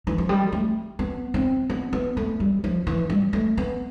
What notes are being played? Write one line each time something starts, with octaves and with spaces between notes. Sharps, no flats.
E3
F3
G3
A3
B3
C4
B3
B3
A3
G3
F3
E3
G3
A3
B3